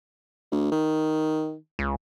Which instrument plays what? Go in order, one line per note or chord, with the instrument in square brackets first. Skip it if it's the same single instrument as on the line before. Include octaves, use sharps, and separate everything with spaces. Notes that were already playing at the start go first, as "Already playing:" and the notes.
[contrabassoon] D2
D#3
[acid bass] C#2